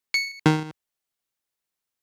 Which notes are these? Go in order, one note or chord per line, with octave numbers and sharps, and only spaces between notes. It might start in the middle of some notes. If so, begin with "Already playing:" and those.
C#7
D#3